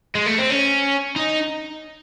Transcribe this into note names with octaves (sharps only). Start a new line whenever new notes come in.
G#3
A3
C4
C#4
D#4